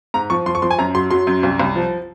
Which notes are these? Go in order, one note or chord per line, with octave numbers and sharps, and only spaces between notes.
G#2 A#5
F3 C#6
F3 C6
C#6
F3 C6
G#5
F#2 A#5
F#3 C6
F#3 C6
F#2
C2
C2
F3